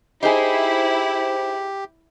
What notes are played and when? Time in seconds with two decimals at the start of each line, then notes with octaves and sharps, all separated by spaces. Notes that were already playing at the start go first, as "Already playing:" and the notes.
0.23 D#4 E4 G4 G#4 C5